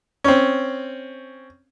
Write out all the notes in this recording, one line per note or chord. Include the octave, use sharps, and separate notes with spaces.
C4 C#4